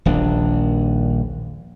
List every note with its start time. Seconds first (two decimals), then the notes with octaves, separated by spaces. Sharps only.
0.05 D#1 A#1 D#2 D4